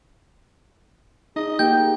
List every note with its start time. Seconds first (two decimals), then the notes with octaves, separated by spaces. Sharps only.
1.36 D#4 G#4 D#5
1.59 A#3 D#4 G4 G5 G6